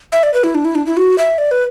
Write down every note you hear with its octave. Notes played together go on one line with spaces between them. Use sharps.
E5
D5
B4
E4
D4
E4
D4
E4
F#4
E5
D5
B4